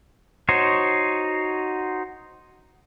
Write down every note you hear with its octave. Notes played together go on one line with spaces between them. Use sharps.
D#4 F#4 C5 C#5